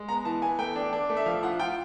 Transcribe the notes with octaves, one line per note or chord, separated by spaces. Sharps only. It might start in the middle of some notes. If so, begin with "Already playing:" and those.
Already playing: G#3
B3 A#5
E3 A5
B3 G#5
A3 G5
D4
D4
A3
E5
F3 F5
F4 F#5
F4 G5